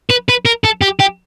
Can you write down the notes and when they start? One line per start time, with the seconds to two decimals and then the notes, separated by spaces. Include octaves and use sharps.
0.10 B4
0.29 B4
0.46 A#4
0.65 A4
0.82 G4
1.00 G4